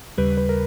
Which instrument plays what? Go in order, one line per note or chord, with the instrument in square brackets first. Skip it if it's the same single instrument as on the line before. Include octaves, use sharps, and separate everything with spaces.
[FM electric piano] D#2 C#3 G3 [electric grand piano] B4
[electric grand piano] B4
A#4